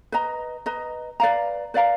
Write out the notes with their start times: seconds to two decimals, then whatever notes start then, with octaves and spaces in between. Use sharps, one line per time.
0.12 B4 D#5 A#5
0.66 B4 D#5 A#5
1.20 B4 D5 F5 A#5
1.74 B4 D5 F5 A#5